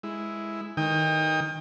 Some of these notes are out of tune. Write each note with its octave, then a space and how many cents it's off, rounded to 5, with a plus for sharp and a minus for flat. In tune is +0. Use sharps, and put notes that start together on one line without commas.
G#3 +0 E4 +0
D#3 +0 G5 +30 D#6 +5